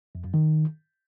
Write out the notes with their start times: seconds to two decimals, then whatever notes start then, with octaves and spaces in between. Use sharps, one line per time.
0.15 F2
0.24 F#2
0.34 D#3